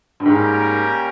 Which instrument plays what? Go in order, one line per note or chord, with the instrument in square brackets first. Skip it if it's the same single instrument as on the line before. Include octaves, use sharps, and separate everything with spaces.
[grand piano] G2
[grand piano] G#2 [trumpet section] G3 A#3 C#4 G4 A#4